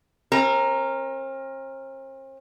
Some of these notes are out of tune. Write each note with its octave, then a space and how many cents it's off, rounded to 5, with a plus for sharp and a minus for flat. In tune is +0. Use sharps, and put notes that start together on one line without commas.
C4 +45 A#4 +0